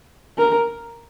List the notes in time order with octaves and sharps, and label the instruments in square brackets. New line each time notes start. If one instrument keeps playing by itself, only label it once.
[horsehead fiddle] A#4